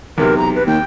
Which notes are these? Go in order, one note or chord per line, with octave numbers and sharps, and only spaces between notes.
B1 E2 C3 A#4
A#5
B4
D#2 G5